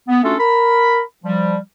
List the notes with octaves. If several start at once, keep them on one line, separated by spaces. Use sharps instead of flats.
B3
A3 C#4 D4 F4 F#4 A4
A#4 B5
F3 G3